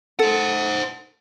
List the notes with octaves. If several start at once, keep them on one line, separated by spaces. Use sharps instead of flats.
A4 C5 F#5